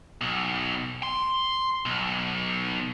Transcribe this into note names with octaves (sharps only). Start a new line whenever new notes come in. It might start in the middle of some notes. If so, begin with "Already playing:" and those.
B1
C6
B1